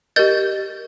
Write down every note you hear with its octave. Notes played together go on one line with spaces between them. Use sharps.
G4 A#4 D#5 G6 A6